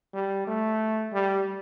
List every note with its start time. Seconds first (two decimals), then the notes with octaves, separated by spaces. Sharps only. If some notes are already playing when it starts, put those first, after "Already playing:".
0.14 G3
0.47 A3
1.12 G3